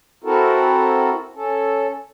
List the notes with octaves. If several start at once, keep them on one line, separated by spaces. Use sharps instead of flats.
C4 E4 F#4 A4 A#4
C#4 A4